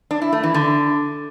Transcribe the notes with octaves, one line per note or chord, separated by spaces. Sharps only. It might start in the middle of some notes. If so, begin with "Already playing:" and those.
D4
E4
A3
E3
D3